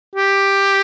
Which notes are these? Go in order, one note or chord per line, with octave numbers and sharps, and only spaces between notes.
G4